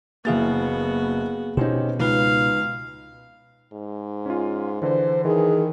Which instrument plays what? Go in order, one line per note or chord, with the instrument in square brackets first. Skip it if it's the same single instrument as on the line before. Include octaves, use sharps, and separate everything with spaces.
[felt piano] F#1 E4 A6 [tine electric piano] A#3 G#4 F5 [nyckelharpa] B3 F#4
[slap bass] B2 [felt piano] C4 C#4 D#4 [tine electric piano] G4
[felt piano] C#2 [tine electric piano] D#4 B4 [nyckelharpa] F5
[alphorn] G#2
[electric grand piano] C#4 F4
[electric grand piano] D3 E3 [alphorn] C5
[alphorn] D#3 [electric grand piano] E3 [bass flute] G#4